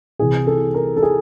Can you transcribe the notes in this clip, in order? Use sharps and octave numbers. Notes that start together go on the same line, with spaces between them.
C2 C3 E3 G#4
A4
A#4
A4
G#4